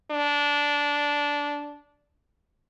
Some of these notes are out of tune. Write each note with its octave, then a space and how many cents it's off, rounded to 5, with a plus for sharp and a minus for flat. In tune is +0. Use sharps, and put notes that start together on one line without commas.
D4 -15